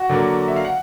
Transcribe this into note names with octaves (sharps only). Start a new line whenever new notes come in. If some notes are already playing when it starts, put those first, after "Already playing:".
Already playing: F#4 F#5
D3 F#3 A#3
E5
F5
F#5